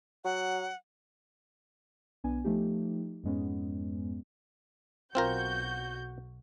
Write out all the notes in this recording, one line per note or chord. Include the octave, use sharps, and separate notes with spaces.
F#3 F#5
B1 B3 D4 G#5
F3 A3 D#4 G4
F2 G#2 G#3 B3 C#4
B1 C4 F4 F#4 A#4 G6